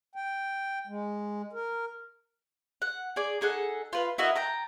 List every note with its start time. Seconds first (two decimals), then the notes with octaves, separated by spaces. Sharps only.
0.16 G5
0.87 G#3
1.53 A#4
2.82 F#5
3.16 G#4 D5
3.41 D#4 G#4 A4 F#5
3.93 F4 B4
4.18 E4 F#4 A#4 D#5
4.35 G5 A5 A#5